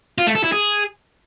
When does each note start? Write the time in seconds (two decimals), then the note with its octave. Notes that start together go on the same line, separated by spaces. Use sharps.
0.18 F4
0.27 A3
0.35 A4
0.44 E4
0.52 G#4